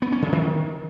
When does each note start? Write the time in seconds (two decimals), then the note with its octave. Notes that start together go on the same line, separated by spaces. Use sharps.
0.02 B3
0.12 C#4
0.22 C#3
0.32 D#3